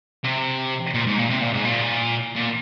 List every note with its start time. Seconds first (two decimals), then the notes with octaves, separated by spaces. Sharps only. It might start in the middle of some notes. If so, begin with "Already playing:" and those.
0.24 C3
0.94 A#2
1.06 G#2
1.18 A#2
1.30 C3
1.42 A#2
1.53 G#2
1.65 A#2
2.36 A#2